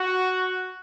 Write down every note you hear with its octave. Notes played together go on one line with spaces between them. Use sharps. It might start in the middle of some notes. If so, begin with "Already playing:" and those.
Already playing: F#4